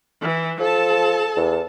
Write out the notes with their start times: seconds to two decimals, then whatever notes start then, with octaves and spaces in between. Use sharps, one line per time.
0.21 E3
0.60 F3 A4 A5
1.36 E2